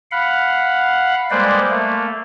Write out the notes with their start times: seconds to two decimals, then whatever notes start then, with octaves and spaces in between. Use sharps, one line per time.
0.11 F5 F#5 B5
1.31 G3 G#3 A#3 B4 C5 D5
1.70 A3 A#3